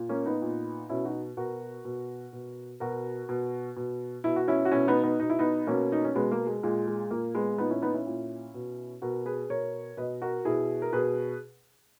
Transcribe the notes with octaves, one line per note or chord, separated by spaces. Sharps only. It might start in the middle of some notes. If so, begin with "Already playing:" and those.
Already playing: A#2
A#3 C#4
B3 D#4
A#2
B2 C#4 E4
D#4 F#4
B2 F#4 A#4
B2
B2
B2 F#4 A#4
B2
B2
B2 E4
F#4
C#4 E4
F#4
B2 C#4 E4
B3 D#4
B3 D#4
B2 D#4
E4
B3 D#4
B2 A#3 C#4
D#4
C#4
B2 G#3 B3
A#3
G#3
A#2 G#3
G#3
A#2 A#3
G#3 B3
A#2 B3 D#4
C#4 E4
B3 D#4
C#4 E4
A#2
B2
B2 F#4 A#4
G#4 B4
B2 A#4 C#5
B2 B4 D#5
F#4 A#4
B2 E4 G#4
A#4
B2 G#4 B4